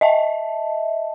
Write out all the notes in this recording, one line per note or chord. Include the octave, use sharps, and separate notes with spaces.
D#5 E5 A5